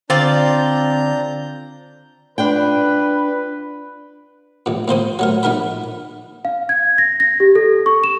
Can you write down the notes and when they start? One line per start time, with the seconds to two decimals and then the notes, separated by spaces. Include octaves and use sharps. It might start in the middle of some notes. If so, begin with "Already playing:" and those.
0.10 D3 C4 D4 F4 D5 A#5 G6
2.38 D4 F4 B4 G5
4.66 A1 A#2
4.88 A2 A#3 C5 D#6
5.19 F#3 A3 A#4
5.43 A#1 D#4 A#4 F#5 B5
6.45 F5
6.69 G#6
6.98 A#6
7.20 A#6
7.40 G4
7.55 A4
7.86 C#6
8.04 E7